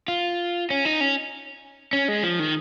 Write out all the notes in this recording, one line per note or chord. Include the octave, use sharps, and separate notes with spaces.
F4
C#4
D#4
C#4
C#4
G#3
F3
D#3